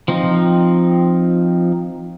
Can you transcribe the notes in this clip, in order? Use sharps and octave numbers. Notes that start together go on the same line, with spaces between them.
F3 C4 D#4